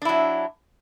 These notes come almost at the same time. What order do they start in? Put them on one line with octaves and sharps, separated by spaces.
D4 E4 F#3